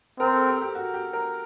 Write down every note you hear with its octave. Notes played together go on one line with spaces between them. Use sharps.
C4 A#4
A4
G4
G4
F#4
G4
A#4